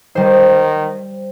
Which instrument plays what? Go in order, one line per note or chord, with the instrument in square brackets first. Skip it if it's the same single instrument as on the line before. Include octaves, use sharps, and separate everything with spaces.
[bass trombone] D#3 [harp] G3 C5